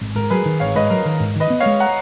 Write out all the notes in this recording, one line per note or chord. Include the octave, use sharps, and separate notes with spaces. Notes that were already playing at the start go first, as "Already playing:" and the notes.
G#1
G#2 A#4
F#3 G#4 B4
D#3
G#1 C#5 F5
G#2 B4 D#5
F#3 A#4
D#3 A#4
G#2
D#3 B4 D#5
B3
C#5 F5
G#3
F#5 A#5